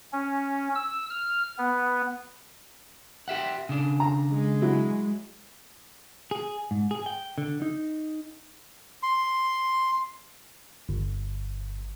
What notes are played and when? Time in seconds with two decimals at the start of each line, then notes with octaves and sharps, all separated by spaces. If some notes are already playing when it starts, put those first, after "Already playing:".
0.13 C#4
0.75 E6
1.10 F6
1.58 B3
3.28 G4 E5 F#5
3.69 C#3 D4
4.00 A#5
4.32 G#3
4.62 F#3 E4
6.31 G#4
6.71 G#2
6.91 G#4
7.06 G5
7.38 D3
7.62 D#4
9.03 C6
10.89 G1